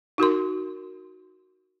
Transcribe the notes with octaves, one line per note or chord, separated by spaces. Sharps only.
D#4 F#4 A#4 C6